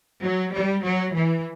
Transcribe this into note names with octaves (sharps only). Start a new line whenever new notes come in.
F#3
G3
F#3
E3